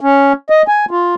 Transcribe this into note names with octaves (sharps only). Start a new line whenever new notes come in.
C#4
D#5
G#5
F4